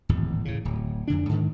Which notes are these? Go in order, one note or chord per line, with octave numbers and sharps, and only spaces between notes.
D1 G#1 E2
A2 C#3
D1
F2 D3 D4
G#2 D#3